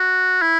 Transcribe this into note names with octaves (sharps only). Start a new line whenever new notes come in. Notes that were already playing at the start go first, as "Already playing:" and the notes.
Already playing: F#4
E4